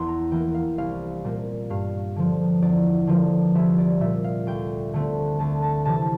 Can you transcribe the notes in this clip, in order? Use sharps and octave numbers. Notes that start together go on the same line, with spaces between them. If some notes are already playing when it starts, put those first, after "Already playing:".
Already playing: E2 C6
A#5
E3 A#3 G5
F5
C2 F5
A#2 G3 A#3
G2 F5
D3 F3
E2 D5
D3 F3 A#3
C2 E5
D5
A#2 G3 E5
F5
D2 G5
D3 A3 C4
D2 A5
A5
C3 E3 A5